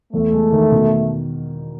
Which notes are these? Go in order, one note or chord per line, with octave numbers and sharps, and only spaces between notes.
E2 A3
G#3
D#3
B2